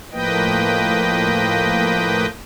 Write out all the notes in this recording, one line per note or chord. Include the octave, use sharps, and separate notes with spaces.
A2 F3 A#3 B4 D#5 G5